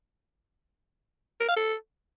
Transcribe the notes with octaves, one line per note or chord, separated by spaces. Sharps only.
A#4
F5
A4